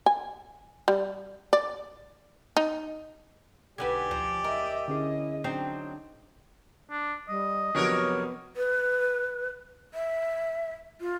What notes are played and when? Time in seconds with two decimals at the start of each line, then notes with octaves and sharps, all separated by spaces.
0.06 G#5
0.88 G3
1.53 D5
2.57 D#4
3.78 B1 D3 F#4 G4 B4 D5 G#5 G#6
4.11 D2 F3
4.44 A#4 D#5 E5
4.88 D3 C#4 E4 G#4 D#5
5.44 F#3 C4 D4 D#4
6.91 D4
7.29 G3 D#5
7.75 F2 C3 F#3 B3 D4 A#4 C#5
8.57 B4
9.94 E5
11.00 F4